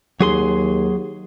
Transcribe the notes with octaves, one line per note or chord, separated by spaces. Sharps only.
D#2 F#3 G#4 C6